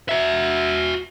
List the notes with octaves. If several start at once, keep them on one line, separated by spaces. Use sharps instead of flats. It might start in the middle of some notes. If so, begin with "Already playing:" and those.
F#4 E5